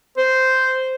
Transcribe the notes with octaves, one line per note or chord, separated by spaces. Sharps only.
C5